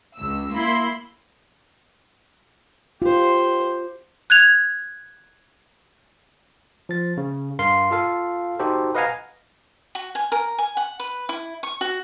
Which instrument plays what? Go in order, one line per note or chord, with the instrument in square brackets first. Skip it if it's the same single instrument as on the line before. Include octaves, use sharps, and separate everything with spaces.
[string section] C#2 E6
A#3 E4 B5 C6
[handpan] F4 [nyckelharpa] G4 C5
[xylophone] F#6 G#6 F7
[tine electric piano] F3 A6
C#3
G2 A#4 F5 C6
F4 A4 F5
D#4 F#4 G4 A4 C5
B4 D#5 F5 F#5 G#5 A#5
[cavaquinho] F#4
G#5
A#4
G#5
F#5
B4
E4
C#6
F#4